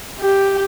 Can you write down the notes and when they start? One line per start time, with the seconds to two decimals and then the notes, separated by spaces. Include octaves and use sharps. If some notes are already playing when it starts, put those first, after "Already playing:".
0.19 G4